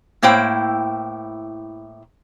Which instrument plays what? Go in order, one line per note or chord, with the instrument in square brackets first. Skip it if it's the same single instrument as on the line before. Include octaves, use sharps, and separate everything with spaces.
[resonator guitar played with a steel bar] A2 A#3 E4 C5 G5